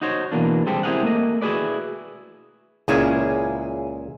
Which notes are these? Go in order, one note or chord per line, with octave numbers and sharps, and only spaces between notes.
D#4 F#4 C5 C#5
B2 E3 A#3 D4
G3 G#3 C4 D4 G4 A4
C4 E4 G4 G#4 A#4 F#5
A3 A#3 D#5
E4 F#4 G#4 B4 D5
C#2 A#2 C#4 E4 G#4 G#5